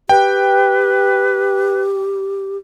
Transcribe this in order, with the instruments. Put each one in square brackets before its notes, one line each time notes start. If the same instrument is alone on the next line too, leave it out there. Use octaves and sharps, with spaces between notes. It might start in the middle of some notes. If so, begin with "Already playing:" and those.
[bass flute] G4 [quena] B4 [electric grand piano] G5